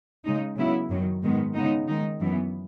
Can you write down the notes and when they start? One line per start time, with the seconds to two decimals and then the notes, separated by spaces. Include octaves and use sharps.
0.24 C#3 G#3 D#4
0.57 C#3 F#3 B3 E4
0.90 F#2 D#3 F#3
1.23 G#2 D#3 G#3 B3
1.54 C#3 G#3 B3 D#4
1.88 D#3 G#3 D#4
2.21 F#2 E3 B3